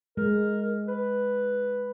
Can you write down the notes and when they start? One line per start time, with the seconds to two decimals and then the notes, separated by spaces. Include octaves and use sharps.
0.17 G#3 A#4
0.88 B4